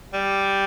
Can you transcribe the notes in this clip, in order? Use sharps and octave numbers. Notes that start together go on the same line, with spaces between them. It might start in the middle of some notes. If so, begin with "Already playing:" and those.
G3